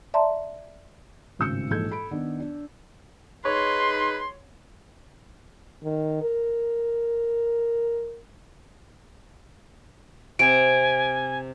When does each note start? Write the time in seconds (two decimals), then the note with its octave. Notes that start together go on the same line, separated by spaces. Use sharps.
0.14 D5 E5 A5 A#5 C6
1.39 G#1 A2 C#3 E6 G6 C#7
1.70 A#1 G#2 E3 A4 G6 G#6
1.90 A4 B5 D7
2.11 D#3 B3 D4
2.40 D4
3.45 D#4 G#4 B4 C#5 C6
5.84 D#3
6.22 A#4
10.39 C3 G#5 D7